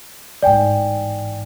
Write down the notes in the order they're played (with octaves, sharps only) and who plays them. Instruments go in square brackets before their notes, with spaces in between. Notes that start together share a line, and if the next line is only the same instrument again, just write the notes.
[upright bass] A1 G#2 [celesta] D5 G5 G#5